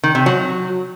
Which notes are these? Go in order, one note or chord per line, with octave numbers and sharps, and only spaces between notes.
D#3
C3
F#3